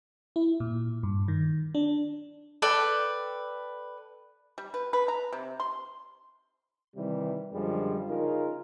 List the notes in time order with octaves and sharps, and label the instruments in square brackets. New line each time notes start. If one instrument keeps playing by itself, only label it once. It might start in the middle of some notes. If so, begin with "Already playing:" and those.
[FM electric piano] E4
A#2
G2
D#3
D4
[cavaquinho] A4 B4 D5 G5
[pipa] G3
B4
B4
A#5
C3
C6
[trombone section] C3 D#3 E3 G3
F#2 D3 F3 G3 G#3
C#3 D#4 F4 A#4